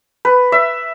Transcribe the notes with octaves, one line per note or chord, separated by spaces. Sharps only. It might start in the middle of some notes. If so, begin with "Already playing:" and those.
B4
E5